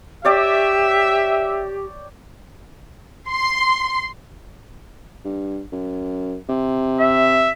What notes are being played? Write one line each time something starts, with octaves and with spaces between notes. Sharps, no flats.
G4 C#5 D5 E5 G5
C6
G2
F#2
C3
E5